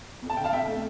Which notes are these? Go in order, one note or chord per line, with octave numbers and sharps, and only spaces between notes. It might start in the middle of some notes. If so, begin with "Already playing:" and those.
F2
A5
D3 G5
F5 A5
F2 E5 G5
A3